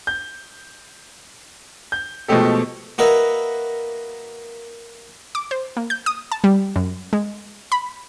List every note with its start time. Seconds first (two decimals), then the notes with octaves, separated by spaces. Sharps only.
0.07 G6
1.92 G6
2.28 B2 F3 G#3 A3 G4 A4
2.98 A#3 F#4 A#4 B4 D#5 E5
5.35 D6
5.51 C5
5.77 A#3
5.90 G6
6.06 D#6
6.32 A5
6.44 G3
6.76 F#2
7.13 G#3
7.72 B5